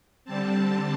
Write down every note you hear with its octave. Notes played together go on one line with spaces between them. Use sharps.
D3 G3 C4 A5